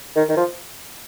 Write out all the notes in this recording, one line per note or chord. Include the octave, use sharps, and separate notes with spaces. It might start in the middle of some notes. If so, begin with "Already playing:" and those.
D#3
D#3
F3